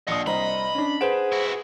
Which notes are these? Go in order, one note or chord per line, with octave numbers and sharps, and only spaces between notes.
A#1 D#5 F#5 D#6
C2 C5 D#5 A#5 B5
C#4 D4
G#4 B4 C5 F#5 D7 E7
E4 F#4